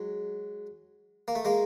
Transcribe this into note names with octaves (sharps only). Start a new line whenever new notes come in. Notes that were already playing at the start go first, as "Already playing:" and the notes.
Already playing: F#3 G#3
A#3
A3
G#3 A#3